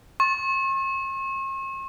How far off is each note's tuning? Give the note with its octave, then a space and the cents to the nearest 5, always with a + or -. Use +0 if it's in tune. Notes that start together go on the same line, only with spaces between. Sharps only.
C#6 -45